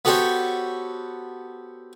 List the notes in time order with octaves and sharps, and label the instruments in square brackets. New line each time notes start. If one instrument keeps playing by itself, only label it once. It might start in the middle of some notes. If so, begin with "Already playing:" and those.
[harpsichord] B3 F#4 G4 A4 C5 C#5